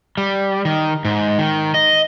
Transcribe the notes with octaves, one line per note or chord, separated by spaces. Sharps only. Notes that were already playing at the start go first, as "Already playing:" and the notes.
G3
D#3
G#2
D#3
D#5